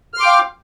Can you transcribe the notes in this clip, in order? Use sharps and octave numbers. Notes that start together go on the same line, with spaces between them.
F5 G5 C6 D6 F6